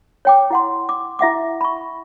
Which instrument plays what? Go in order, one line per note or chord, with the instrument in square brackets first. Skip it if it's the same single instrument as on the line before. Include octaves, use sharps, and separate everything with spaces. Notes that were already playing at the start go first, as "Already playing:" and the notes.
[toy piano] C#5 G5 D6
E4 F#5 C6
D6
E4 E5 F#5 D6
B5 C#6